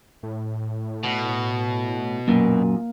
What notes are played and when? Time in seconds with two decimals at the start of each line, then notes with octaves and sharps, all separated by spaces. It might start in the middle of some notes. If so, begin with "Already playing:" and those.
0.23 A2
1.04 B2
2.28 F#2 A#2 A#3